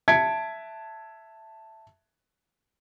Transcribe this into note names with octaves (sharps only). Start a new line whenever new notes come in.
E5 A5 G#6 B6 C#7 D7